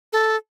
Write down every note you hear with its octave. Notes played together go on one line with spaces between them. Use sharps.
A4